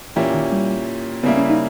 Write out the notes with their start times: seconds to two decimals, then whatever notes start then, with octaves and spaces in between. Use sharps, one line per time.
0.16 A#2 E3 A#3 C#4 E4 G4
0.34 D#3
0.52 G3
1.23 C#3 G3 A#3 B3 E4
1.37 C#4
1.50 D#4